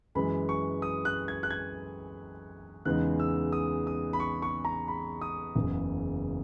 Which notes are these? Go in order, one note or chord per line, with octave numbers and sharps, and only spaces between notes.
F#2 E3 G#3 B5
C#6
D#6
F#6
G#6
F#6
G#6
E2 C#3 E3 G#3 D#4 F#6
E6
D#6
D#6
B5
C#6
C#6
A#5
B5
D#6
F#1 E2 C#3